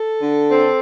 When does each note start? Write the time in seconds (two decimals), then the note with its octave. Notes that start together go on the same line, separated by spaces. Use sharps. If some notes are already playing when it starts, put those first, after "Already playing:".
Already playing: A4
0.20 D3
0.49 C4